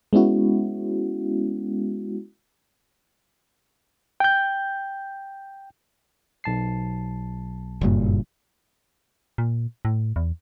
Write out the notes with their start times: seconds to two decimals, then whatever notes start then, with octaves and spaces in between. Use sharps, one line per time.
0.13 G#3 B3 C#4 E4 F#4
4.20 G5 G6
6.44 B1 A5 C7
7.81 F#1 G2 A#2
9.38 A#2
9.85 A2
10.16 E2